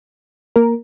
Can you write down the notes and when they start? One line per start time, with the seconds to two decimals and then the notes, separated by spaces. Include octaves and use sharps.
0.56 A#3 A#4